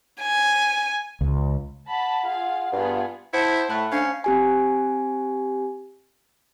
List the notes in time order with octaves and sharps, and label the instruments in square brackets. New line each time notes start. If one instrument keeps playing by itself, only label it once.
[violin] G#5
[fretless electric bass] C#2
[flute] F#5 [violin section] A5 B5
[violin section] F4 G#4 F5
[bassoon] G2 [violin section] B3 F4 G#4
[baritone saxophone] E4 [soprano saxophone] C5 [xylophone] F#5 A5
[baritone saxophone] A2 [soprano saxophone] A3 [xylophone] B5 F#6
[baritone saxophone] C#4 [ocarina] D4 [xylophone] C5 F5
[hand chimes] C4 G4 G#5